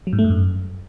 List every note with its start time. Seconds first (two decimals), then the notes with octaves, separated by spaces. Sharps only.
0.07 F#3
0.13 G#2
0.19 A3
0.24 G2
0.30 F#2